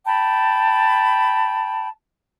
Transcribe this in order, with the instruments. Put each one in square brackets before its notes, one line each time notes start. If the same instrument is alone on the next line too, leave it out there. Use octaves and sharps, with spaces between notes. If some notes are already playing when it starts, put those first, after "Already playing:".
[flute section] G5 B5 [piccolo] A5